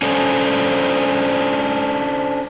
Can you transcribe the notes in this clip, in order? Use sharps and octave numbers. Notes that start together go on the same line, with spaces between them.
C#4 D4 A4 C5